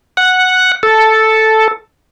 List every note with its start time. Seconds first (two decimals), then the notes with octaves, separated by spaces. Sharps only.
0.17 F#5
0.83 A4